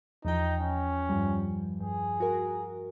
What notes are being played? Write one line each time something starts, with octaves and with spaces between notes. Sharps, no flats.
E2 F3 D#4 G5
C#4
G2 F3 G3
G2 G#4
F#4 A#4